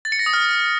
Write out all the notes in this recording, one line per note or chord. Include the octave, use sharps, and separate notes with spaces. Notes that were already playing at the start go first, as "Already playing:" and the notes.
A6
C#7
A#6
D#6
F6